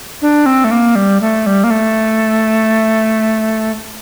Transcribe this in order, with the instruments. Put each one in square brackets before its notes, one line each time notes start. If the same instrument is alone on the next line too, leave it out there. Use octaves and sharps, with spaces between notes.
[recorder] D4
C4
A3
A#3
G3
A3
G3
A#3
A3